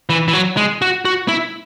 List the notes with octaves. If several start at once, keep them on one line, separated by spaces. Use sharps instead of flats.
E3
E3
F#3
G#3
F#4
F#4
E4